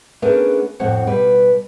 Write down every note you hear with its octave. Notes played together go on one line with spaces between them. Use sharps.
A3 B3 C#4 D4 G#4 A#4
F2 A2 C4 F#4 F#5
B2 G3 B4